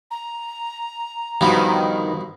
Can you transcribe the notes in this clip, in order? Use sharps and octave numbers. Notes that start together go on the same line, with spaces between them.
A#5
G2 B2 D#3 F3